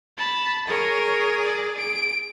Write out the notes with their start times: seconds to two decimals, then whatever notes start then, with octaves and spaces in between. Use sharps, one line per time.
0.17 A5 B5
0.67 G#4 A#4 C#5
1.44 D5
1.78 D7